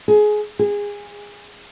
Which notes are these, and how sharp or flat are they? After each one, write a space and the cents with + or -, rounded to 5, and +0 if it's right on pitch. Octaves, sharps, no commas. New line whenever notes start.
G#4 +20
G#4 -20